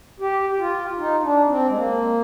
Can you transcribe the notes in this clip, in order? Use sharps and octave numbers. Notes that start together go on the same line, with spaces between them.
G4
G4
F4
D#4
D4
C4
G#3
A#3